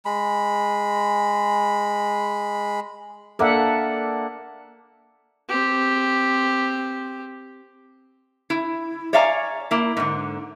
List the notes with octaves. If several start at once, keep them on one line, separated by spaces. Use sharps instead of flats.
G#3 B5
A#3 D4 A4 E5 F#5
C4 G4
E4
C#5 D5 E5 F5 G#5 A#5
A#3 E4
G#2 D3